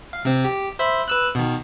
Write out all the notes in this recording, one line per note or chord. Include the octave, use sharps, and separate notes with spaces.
F5
C3 C4
G4
C5 E5 B5
B4 E6 F#6
B2 D#3